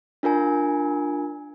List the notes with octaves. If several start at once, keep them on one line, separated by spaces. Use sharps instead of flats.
D4 F4 A#4 G#5